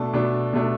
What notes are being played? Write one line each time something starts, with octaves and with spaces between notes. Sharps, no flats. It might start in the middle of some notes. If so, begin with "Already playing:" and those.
Already playing: B2 A3 D4 A5
B2 A3 D4
B2 A3 D4